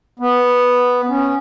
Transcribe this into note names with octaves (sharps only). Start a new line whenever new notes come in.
B3
C#4